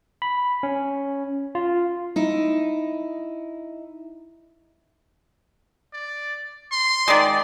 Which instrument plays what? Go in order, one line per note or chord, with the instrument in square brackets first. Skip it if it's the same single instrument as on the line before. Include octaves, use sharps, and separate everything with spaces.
[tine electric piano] B5
C#4
F4
[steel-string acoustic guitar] D#4 E4
[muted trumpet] D5
C6
[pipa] D#3 G#3 [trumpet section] D5